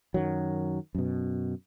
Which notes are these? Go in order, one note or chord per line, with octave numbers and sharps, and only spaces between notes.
F#2 D#3 F#3
F#2 B2